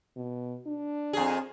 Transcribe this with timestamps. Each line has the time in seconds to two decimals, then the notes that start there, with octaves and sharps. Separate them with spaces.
0.16 B2
0.66 D4
1.13 F2 G#4